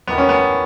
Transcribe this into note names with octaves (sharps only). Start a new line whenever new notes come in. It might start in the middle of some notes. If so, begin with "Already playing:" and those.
E2 D#3 B3
C#4
B3